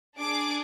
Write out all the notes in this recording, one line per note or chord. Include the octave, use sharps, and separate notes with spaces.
D4 G#4 D6